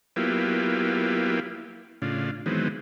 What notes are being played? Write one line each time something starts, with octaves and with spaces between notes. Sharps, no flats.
F#3 A#3 B3 E4 F4 G4
A2 C#3 D4 F4
D#3 E3 F#3 G#3 B3 C4